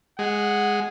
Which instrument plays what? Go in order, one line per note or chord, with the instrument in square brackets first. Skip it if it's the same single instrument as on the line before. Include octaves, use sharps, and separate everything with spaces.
[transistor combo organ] G#3 [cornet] F#5